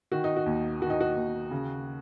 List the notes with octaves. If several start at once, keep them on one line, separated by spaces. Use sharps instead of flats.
D#3 F#4
D#4
F#4
D#2
D#3 F#4
D#4
F#4
D#2
C#3